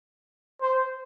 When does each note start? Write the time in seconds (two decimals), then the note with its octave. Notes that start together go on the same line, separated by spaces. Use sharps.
0.62 C5